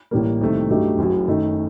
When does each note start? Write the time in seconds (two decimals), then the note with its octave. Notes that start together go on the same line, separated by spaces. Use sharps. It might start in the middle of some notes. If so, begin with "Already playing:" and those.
0.11 A1 A2 G3 A#3
0.41 C2 C3 D#3 A3
0.70 G2 F#3 A3 D#4 G4
0.98 F#1 F#2 F#3
1.28 F#2 D#3 A3 D#4